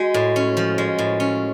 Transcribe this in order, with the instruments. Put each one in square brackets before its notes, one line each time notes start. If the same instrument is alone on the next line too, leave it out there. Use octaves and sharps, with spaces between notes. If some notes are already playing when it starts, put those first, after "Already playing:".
Already playing: [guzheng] G#3 [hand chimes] F#4
[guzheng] A2
C#4
F3
G#3
A2
C#4